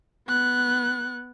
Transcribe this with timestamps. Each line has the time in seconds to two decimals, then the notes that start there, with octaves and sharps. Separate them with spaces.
0.28 B3 F#6